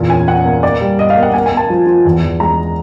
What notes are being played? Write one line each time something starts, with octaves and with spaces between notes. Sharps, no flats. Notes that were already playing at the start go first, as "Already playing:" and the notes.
Already playing: E2 A#2
C#4 G#5
C#4 F#5
A#3
A#3 D5
G3
A#3 D#5
F5
A#3
F#5
A#3 G#5
G#5
A#3
A5
F3
F3
E2
E2
G#3 A#5